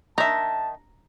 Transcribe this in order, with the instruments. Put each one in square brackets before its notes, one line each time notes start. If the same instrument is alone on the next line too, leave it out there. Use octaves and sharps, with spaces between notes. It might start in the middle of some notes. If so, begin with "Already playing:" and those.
[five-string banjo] D#3 E5 [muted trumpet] A5 [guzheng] A#5